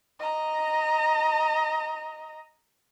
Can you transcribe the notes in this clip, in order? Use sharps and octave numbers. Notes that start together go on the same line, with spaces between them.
D#5 A#5